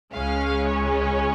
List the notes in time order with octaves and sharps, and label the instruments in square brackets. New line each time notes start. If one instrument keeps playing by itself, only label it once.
[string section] C#2 C#3 G#3 C#4 F5
C#5